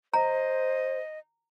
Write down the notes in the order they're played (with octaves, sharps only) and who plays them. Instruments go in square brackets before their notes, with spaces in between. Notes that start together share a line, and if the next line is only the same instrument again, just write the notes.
[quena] C5 [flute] D#5 [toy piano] A#5